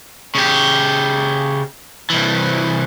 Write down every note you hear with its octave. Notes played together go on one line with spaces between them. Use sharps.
C#3 G4
C2 E3